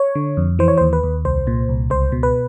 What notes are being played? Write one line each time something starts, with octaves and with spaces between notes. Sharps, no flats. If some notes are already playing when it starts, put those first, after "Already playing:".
Already playing: C#5
D3
F2
E3 C5
C#5
D#2 C5
B4
D#2
C2 C5
A#2
C2
C#2 C5
B2
B4